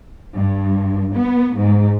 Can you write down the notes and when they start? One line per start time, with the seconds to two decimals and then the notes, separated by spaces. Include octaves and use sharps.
0.36 G2
1.15 B3
1.57 G#2